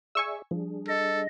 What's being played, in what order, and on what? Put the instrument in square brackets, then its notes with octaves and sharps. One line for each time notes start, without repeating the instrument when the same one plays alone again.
[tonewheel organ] G#4 D5 E5 [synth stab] G#5 C#6 E6
[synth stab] F3 [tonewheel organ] G3 D4 G#4
[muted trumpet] A4 [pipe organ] D#5